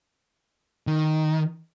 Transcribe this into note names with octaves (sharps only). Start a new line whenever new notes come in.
D#3